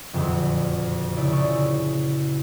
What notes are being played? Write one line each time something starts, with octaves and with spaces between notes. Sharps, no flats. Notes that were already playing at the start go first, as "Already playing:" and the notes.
F#1 F2 A#2 D3
C#3 E4 D5
C#3 G#4 C#6